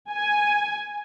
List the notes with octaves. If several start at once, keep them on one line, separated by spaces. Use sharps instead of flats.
G#5